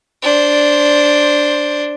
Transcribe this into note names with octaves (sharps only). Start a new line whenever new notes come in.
D4 C5